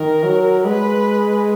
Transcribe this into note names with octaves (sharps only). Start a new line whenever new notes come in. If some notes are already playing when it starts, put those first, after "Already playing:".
Already playing: D#3 A#4
F#3
G#3 B4